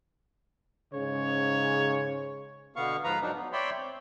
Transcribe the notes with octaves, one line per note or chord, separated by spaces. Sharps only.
G#2 C#3 C#5
B2 D3 B3 F5 C#6
G#2 F3 B4 F5 A#5
F#3 D4 D#4
B3
C#5 D5 E5 G5 B5 C6
C4